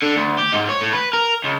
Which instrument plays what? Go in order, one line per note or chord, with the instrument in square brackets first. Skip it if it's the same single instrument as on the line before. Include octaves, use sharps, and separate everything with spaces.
[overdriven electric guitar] D3
D2
G4
G#2
C#5
A2
B4
A#4
C#2